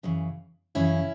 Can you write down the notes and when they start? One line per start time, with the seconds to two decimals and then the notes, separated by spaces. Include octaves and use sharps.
0.03 F#2 C#3 E3
0.75 F#2 C#3 E3 C#4 E4